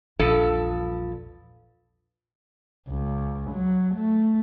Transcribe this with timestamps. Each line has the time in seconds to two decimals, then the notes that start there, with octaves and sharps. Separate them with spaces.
0.19 A#1 E2 G2 F3 A4
2.88 C#2
3.51 F#3
3.95 A3